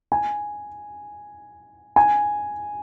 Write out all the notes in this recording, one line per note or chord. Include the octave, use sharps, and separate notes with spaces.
G#5
G#5